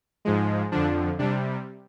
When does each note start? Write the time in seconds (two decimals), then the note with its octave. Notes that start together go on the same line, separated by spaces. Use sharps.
0.25 G#2 F3 G#3
0.72 F2 D3 F3 D4
1.19 C3 G3 D4